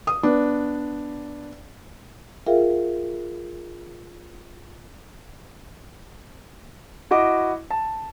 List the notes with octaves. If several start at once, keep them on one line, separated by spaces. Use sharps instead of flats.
D#6
B3 D4
F4 G#4 A#4 E5 F5 G5
E4 F#4 D#5 D6
A5